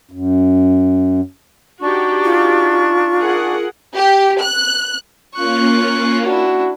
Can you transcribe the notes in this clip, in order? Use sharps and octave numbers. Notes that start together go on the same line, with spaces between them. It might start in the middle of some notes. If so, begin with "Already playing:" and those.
F#2
D4 D#4 F#4 G4 C#6
F4
G#4 A#4 F#5
G4
F#6
A#3 C#4 F4 C#6 F#6
D4 E4 F#4